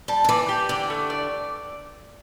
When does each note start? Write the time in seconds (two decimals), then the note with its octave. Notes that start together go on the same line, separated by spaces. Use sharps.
0.08 G3 A5
0.24 D3
0.29 E3 D5
0.49 G4
0.69 D3 D5
0.90 A3
1.10 D5